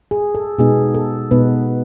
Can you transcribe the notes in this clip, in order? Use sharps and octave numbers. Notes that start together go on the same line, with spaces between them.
G#4
A4
B2 G#3 B3 D#4 G#4
A4
B2 G#3 B3 D#4 B4